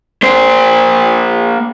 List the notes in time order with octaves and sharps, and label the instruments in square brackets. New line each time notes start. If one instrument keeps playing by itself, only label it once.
[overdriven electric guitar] A#3 C5